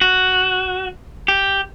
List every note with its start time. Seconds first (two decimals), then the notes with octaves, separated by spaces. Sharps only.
0.01 F#4
1.28 G4